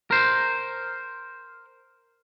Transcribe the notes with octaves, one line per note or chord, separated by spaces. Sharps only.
A#4 C5